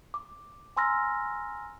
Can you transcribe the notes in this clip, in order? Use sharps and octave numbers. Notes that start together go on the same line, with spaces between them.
D6
G#5 A#5 C6 E6 F6 A#6